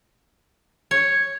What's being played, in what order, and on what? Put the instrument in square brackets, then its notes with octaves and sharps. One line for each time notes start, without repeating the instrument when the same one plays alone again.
[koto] C#5